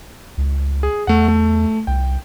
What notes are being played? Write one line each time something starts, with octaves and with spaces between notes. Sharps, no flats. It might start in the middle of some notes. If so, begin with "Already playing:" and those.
C#2
G#4
E2 A3 F#5
A3
C2 G5